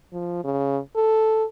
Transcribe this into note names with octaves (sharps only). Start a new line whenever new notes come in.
F3
C#3
A4